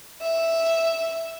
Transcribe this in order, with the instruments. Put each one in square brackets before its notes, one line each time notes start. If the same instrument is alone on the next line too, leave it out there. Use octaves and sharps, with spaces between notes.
[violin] E5